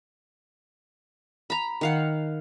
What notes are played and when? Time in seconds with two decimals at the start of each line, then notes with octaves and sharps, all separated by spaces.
1.50 A#5 B5
1.81 D#3 F5 F#5